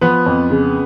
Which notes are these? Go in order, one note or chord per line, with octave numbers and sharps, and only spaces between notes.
F3 B3 B4
F2
C#3